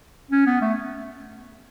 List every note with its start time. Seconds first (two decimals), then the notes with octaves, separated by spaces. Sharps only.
0.31 C#4
0.46 B3
0.61 A3